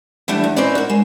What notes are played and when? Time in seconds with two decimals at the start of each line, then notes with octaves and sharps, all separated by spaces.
0.28 E3 G3 A3 B3 D4
0.44 E2
0.56 C4 C#4 D#4 E4 B4 D5
0.75 F#4 A#4
0.90 G#3